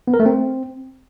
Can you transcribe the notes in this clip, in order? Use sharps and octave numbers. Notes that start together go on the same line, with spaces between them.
B3
A#4
A3
C4